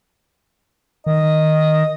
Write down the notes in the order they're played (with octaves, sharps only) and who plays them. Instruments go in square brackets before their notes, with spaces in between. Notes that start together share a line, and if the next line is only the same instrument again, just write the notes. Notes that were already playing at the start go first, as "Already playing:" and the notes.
[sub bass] D#3 [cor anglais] D#5